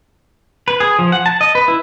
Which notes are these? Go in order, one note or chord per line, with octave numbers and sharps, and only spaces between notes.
B4
G#4
F3
F#5
A5
D#5
B4
E4